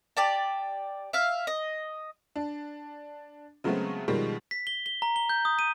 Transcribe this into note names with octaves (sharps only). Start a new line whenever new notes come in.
G4 D5 A5
E5 F5
D#5
D4
C#3 F#3 G#3 A3 B3 C4
B2 D#3 F3 G3 G#3
B6
G7
G7
A#5
G7
G6
D#6
D#7